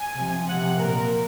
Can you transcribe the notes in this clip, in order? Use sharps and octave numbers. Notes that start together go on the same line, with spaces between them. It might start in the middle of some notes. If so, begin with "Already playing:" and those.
Already playing: G#5
C3 F3
C3 F3 F#5
A#2 F3 A#4